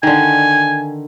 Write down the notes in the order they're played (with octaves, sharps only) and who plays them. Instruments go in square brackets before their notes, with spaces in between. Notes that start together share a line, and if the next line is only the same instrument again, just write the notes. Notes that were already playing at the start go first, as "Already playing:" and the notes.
[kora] D3 D#3 [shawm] G#5